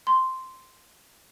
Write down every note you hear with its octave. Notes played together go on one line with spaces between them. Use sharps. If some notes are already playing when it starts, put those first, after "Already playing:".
C6